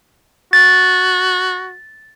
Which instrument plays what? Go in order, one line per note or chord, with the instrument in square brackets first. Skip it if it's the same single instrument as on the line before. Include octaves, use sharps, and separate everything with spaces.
[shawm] F#4 [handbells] A6